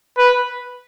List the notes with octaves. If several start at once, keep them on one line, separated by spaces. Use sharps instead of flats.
B4